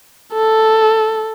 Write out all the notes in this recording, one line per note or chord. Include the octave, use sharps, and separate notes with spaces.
A4